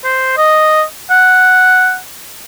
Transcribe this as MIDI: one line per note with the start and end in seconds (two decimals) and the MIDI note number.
0.04 0.37 72
0.37 0.83 75
1.10 1.97 78